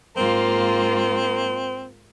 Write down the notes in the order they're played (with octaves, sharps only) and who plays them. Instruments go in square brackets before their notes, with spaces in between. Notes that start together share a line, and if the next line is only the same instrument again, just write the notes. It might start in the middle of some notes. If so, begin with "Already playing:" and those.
[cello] G#2 F4 [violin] A#3 [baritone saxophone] C4